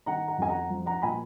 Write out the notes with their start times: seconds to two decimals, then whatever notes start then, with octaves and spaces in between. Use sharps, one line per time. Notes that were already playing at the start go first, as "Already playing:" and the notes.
0.06 D#3 F#5 A#5
0.28 F#5 A#5
0.38 F2 G#5
0.49 F#5 A#5
0.70 F3
0.86 F#5 A#5
1.02 A#2 G#5 B5